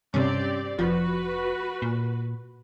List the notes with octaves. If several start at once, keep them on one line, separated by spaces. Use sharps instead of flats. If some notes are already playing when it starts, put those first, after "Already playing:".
G2 C3 C4 C#4 G4 D5
F1 F3 F#4 B4
A#2